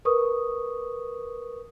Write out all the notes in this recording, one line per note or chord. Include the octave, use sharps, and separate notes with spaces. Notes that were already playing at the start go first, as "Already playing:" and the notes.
A#4 B4 C#6 D#6